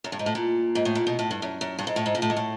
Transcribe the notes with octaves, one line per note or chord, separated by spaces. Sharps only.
F#2
G2
G#2
A2
A#2
G#2
A2
A#2
B2
A2
G2
F#2
F#2
G2
G#2
A2
G#2
A#2
A2
G#2
A2